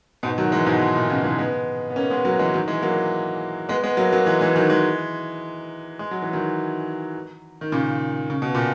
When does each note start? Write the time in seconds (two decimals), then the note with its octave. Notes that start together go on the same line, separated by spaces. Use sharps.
0.23 G#2 B2
0.38 D#3 F#3
0.52 E3 G#3
0.66 G#2 B2
0.81 G#2
0.95 A#2
1.10 C#3 E3
1.24 E3 G#3
1.39 G#3 B3
1.90 B3
1.96 A#3 C#4
2.10 G#3 B3
2.25 F#3 A#3
2.39 E3 G#3
2.54 D#3 F#3
2.68 E3 G#3
2.82 F#3 A#3
3.69 G#3 B3
3.84 G#3 B3
3.97 F#3 A#3
4.13 F#3 A#3
4.26 E3 G#3
4.41 E3 G#3
4.56 D#3 F#3
4.70 E3 G#3
5.99 G#3
6.11 F#3
6.22 E3
6.33 D#3 F#3
7.61 D#3
7.72 A#2 C#3
8.30 C#3
8.42 B2
8.55 A#2